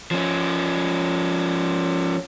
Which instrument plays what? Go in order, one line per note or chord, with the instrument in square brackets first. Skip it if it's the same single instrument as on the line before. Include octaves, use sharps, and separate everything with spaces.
[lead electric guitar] F3 C#4